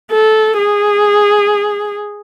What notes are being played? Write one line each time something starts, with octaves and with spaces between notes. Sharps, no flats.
A4
G#4